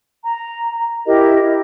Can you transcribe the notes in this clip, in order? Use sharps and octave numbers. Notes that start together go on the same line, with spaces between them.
A#5
E4 G4 A#4 D#5